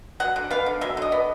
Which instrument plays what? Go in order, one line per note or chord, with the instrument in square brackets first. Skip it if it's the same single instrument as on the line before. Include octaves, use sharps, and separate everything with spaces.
[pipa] F#3 F#5
D3
B3 F5
D3
F#3 E5
D3 D#5
B3